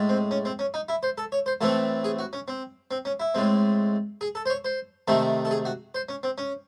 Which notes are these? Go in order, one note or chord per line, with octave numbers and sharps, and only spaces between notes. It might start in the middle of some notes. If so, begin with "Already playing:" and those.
Already playing: A2 G#3
C4
C#4
C4
C#4
D#4
E4
C5
A4
C#5
C5
A2 E3 A3 C4 A4
G#4
F#4
C#4
C4
C4
C#4
E4
A2 G#3 C4
G#4
A4
C5
C#5
C5
C3 D#3 A3 C4 A4
A4
G#4
F#4
C5
C#4
C4
C#4